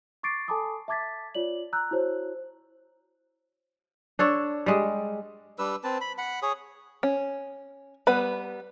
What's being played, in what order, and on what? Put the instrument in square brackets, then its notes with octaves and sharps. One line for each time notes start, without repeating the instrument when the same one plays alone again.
[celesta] C#6 D6 A6 C7 D7
A4 G#5 A5 B5 D6 D#6
E5 A5 D6 G#6 A6 B6
F4 C#5 D5 F#7
A#5 E6 F#6 G6
E4 F#4 C5 C#5
[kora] D4 A4 C#5
G3 G#3
[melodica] G3 D4 B4 E6
C4 B4 A5
B5
F#5 B5
G#4 C#5 D#6
[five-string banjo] C#4
G3 B3 B4 B5